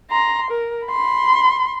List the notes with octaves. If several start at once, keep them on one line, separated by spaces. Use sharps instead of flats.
A#5 C6
A#4
B5 C6